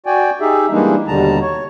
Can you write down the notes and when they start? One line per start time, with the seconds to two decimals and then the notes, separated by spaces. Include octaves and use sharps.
0.06 F#4 D5 G5 G#5
0.41 D#4 G4 G#4 E5
0.71 E3 G3 G#3 A#3 D4 D#4
1.08 D#2 B2 D3 G3 A5 A#5
1.41 C#5